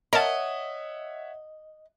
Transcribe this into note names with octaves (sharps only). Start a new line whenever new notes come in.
A#4 C#5 D#5 E5 F#5 A5